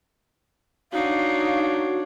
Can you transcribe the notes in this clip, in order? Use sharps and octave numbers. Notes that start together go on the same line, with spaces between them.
D4 D#4 F#4 C#5 F5